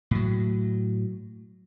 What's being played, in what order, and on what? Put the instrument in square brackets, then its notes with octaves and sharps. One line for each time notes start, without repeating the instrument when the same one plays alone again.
[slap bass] A2 F#3